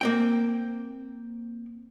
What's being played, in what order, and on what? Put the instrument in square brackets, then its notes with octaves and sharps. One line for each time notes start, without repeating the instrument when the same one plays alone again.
[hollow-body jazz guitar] A#3 C4 G5